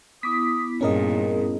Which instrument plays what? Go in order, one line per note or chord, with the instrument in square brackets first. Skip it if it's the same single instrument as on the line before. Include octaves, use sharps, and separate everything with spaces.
[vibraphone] B3 E4 [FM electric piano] D6 B6 [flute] D#6
[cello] G2 A#2 [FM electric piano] C#4 A#4 D#5 [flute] G#4